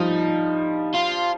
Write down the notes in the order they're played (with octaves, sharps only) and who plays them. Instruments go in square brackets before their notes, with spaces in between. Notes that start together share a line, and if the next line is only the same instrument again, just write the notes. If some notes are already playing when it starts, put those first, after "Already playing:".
Already playing: [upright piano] F3 G3 [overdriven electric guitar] D#4
[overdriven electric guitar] F4